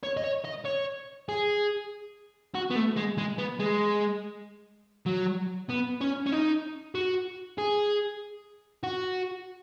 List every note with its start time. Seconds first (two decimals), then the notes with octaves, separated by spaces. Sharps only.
0.03 C#5
0.17 D#5
0.24 C#5
0.45 D#5
0.65 C#5
1.29 G#4
2.55 F#4
2.70 B3
2.75 A3
2.96 G#3
3.18 G#3
3.38 B3
3.59 G#3
5.06 F#3
5.69 B3
6.01 C#4
6.26 C#4
6.32 D#4
6.95 F#4
7.58 G#4
8.84 F#4